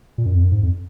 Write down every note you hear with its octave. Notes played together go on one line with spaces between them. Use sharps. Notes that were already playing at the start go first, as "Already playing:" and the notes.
A#2
F#2
F2
F#2
G#2
F2